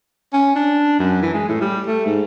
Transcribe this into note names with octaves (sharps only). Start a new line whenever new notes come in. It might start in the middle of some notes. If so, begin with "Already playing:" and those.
C#4
D4
F#2
E3
G#3
A2
G3
A3
G#2